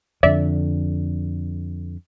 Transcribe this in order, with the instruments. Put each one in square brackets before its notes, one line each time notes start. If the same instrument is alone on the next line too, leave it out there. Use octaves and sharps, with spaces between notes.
[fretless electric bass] F2 D3 [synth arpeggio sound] D5 E5